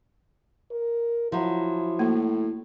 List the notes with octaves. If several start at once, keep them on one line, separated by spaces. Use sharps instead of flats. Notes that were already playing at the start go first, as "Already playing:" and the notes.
A#4
F3 F#3 E4
A2 A#3